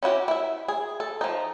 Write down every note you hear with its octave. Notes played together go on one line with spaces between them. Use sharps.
C#4 E4 F#4 G4
E4 E5
G#4
A4
F3 D#4